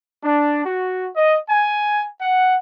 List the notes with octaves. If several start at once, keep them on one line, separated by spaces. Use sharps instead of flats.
D4
F#4
D#5
G#5
F#5